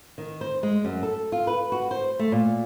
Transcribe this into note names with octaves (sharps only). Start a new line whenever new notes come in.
D#3
C5
G#3
F#2
A4
F4
B4
F#4
C5
A3
A#2